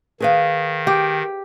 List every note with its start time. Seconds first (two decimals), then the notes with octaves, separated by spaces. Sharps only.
0.20 D#3 G#4 B4 F5
0.87 G4